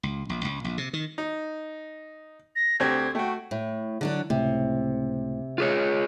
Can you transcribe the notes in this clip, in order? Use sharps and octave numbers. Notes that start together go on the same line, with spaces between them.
C#2
A#1
C#2
A#1
C3
D#3
D#4
A#6
D2 C4 G4 G#6
A3 F#4 G5
A2
D3 F#3 D4
C#2 A2 C3
F4 G#4 C#5